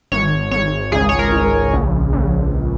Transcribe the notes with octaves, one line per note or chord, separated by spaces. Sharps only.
G#1 C#5
G#1 C#5
C#2 G#4
C#5
A#4
C#2
A#1
A#1